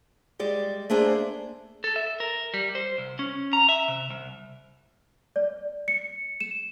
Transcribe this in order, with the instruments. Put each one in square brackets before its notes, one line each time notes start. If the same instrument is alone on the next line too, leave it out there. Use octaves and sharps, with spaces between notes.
[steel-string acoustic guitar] G3 G#3 D5
A3 A#3 D4 G#4 C5
[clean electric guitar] A4
E5
A#4
G3
C5
C2
C#4
A#5
E5
C3
C2
[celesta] D5
C#7
E7